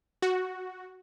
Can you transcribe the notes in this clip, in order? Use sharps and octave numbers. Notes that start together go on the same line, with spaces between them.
F#4